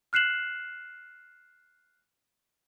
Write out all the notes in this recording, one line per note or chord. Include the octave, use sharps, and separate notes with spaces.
F6 F#6 C7 E7 F#7